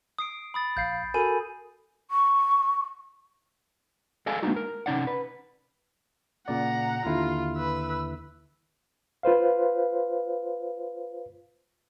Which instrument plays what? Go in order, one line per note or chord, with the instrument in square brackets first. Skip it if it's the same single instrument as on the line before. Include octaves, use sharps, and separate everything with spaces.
[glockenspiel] D#6 C7 D7
B5 D#6 A6
[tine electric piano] A#1 F5 C7 [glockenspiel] G6
[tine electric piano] F#4 A4 A#4 [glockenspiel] G#5 B5 D#7
[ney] C#6
[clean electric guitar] G#4 A4 D5 D#5 F5 G#5
G#3 A#3 B3 D4 D#4 F#4
A#4
C3 C#4 D#4 D5 F#5
B4
[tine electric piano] A#2 C#3 D5 [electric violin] F#5 A#5
[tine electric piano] D#2 D3 E4 [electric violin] F4
[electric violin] B4 E6
[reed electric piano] F4 B4 C5 F5